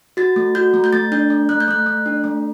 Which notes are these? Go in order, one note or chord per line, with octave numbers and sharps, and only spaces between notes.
F#4 A6
A3
F#4 G6
A3
G6
A3 A6
D4 G6
A3
A3 F#6
G6
A3 F#6
A3
D4
A3